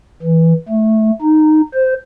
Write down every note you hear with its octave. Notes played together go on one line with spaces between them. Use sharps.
E3
A3
D#4
C5